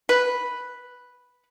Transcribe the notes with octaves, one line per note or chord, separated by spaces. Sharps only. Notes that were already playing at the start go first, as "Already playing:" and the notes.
B4